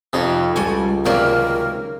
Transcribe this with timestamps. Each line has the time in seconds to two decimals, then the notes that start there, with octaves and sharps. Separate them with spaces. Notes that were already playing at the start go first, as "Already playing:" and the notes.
0.13 F2 C3 D#4
0.56 C#2 G3 F#4 A4 G#5
1.06 C3 D#3 F#3 A#3 A#4 D5